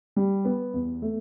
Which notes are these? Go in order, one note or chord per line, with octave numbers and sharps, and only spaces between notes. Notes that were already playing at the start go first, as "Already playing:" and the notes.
G3
B3
E2
A3